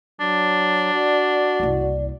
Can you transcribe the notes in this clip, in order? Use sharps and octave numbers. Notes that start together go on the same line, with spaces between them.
F#3 D4
F#4 D5
F#1 C2